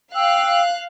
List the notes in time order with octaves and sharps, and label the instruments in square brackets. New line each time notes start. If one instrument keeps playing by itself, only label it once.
[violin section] F5 F#6 [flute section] G5 E6